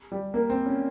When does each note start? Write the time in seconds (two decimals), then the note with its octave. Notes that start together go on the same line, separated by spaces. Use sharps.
0.12 G3
0.34 A#3
0.50 C4
0.66 C#4